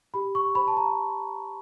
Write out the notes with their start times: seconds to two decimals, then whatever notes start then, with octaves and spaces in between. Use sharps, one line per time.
0.14 G4 B5
0.35 C#6
0.55 C5 B5
0.68 A5
0.77 A#5